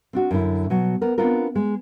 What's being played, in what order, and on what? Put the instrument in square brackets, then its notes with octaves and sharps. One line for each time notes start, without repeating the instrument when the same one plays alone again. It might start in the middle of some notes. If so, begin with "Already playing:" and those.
[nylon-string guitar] C4 D4 F#4
F#2 D3 E4
B2 F#3
B3 A#4
B3 C4 D4 F4 A#4
G#3